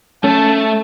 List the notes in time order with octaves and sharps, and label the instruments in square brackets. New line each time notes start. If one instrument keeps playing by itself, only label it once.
[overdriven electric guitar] A3 [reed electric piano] C#4 [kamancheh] A5